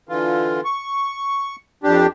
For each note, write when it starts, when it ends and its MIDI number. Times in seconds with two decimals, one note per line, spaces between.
0.09 0.61 50
0.09 0.61 52
0.09 0.61 65
0.65 1.56 85
1.83 2.07 41
1.83 2.07 62
1.83 2.07 67